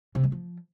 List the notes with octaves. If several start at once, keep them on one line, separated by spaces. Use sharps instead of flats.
C3
G#3
F3